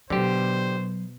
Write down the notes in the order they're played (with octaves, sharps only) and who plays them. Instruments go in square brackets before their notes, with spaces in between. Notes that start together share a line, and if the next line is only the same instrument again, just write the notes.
[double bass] B2 [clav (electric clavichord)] D3 G4 [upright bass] F#3 [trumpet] C5